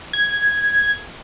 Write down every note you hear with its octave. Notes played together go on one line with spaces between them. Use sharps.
G#6